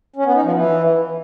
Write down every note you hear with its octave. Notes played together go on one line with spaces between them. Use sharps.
C#4
B3
D#4
F3
E3